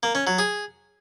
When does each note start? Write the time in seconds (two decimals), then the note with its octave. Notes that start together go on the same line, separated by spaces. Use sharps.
0.03 A#3
0.15 C#4
0.27 F#3
0.39 G#4